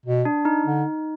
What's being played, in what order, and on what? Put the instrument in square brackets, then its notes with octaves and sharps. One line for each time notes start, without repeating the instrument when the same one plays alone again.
[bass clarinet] B2
[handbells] D4
D#4
[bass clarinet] D3